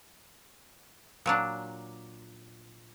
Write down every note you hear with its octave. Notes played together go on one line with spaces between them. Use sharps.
A#2 F#3 D4